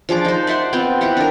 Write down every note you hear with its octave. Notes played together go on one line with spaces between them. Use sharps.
F3 D4 G#4 D6
D#4 C5
D5 E5 F#5 C6
B3 C4 F4 G5
E4 G4 F#5 G5
D4 A#4